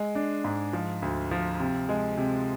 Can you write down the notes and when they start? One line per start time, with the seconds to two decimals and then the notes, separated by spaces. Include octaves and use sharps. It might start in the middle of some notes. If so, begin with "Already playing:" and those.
Already playing: G#3
0.15 D4
0.44 G#2
0.73 F3
1.02 D2
1.31 F3
1.60 C3
1.89 G#3
2.18 C3